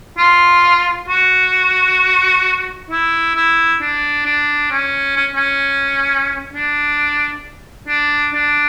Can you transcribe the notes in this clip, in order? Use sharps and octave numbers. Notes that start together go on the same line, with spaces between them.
F4
F#4
E4
E4
D4
D4
C#4
C#4
C#4
D4
D4
D4